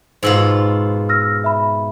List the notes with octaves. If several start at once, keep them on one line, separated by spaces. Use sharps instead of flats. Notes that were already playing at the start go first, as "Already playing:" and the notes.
G#2 B2 F4 C5 E6 F#7
E6 F6 A#6
E5 B5